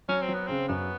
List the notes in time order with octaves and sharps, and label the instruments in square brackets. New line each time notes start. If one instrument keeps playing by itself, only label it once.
[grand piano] F#3 [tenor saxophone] C#4
[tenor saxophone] C4
[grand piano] F#3
[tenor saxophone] B3
[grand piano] C#3 [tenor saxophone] C4
[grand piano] F#2 [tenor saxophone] B3